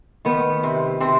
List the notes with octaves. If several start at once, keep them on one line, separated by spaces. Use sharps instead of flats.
D#3 B3
C3
C3 C4